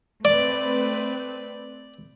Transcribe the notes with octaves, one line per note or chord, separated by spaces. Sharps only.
A3 C4 B4 D5